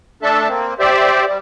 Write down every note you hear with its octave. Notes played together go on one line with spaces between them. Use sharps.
A3 D4 A4 E5 A5
A#3 C4
G4 C5 D5 E5
G3